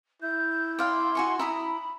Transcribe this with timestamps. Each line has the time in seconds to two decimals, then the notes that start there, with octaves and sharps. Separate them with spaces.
0.22 E4 G6
0.79 D5 F5 G5 C6
1.15 F#4 G#5 C#6
1.39 E4 A#5 B5 D#6